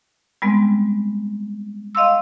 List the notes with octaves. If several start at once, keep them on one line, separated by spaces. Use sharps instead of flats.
G3 G#3 B3 C4
D#5 F5 C6 E6